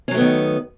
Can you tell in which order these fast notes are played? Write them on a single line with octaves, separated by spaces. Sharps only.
C#4 F#3 A3 B3 D#3